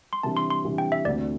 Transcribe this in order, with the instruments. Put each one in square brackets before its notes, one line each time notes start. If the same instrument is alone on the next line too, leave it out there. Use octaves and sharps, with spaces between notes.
[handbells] C6
[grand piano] C3 E3 G3 D4 [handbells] A5
[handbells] C6
C6
[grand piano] C3 E3 G3 D4
[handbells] G5
E5
[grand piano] D2 D3 A3 C4 [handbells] D5